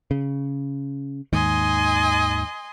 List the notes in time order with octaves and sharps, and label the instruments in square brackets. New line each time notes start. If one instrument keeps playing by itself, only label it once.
[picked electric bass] C#3
[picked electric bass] D#2 G#2 D#3 [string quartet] D#5 G#5 C6